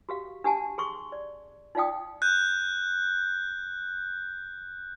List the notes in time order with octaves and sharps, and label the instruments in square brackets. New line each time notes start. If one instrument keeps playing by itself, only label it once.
[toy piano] F#4 G4 F5
D4 G4 F#5 G#5 A5
G#4 C6 C#6
D5
D#4 F4 D5 F5 G5 D#6
[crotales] F#6 G6